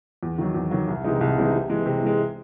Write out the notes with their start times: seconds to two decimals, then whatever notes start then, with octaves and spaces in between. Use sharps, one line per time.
0.23 E2
0.38 D#3 F#3
0.55 E2
0.71 D#3 F#3
0.88 C2
1.04 C3 E3 G#3 D#4
1.21 C2
1.37 C3 E3 G#3 D#4
1.53 C3
1.70 E3 G#3
1.86 C3
2.03 E3 G#3